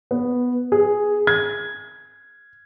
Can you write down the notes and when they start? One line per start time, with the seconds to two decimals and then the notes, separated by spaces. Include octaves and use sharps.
0.11 B3
0.72 G#4
1.27 G#6